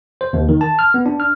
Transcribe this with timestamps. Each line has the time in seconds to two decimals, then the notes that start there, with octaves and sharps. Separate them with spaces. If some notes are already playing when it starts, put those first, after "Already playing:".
0.21 C5
0.33 D#2
0.49 D#3
0.61 A5
0.79 F6
0.94 B3
1.06 D4
1.20 F6